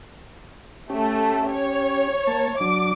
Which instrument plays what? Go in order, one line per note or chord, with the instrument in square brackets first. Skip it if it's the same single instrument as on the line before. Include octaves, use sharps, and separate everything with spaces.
[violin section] A3 [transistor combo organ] C#4 G4
[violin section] C#5
[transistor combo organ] A#3 A5
[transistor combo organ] F#3 D4 [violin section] D6